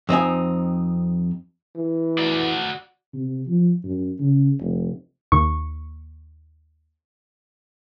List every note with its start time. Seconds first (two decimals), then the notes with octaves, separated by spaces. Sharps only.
0.09 F2 C4 D#4 G#5
1.75 E3
2.18 F#4 D5
3.14 C3
3.47 F3
3.84 F#2
4.20 C#3
4.60 F1
5.32 D#2 C#6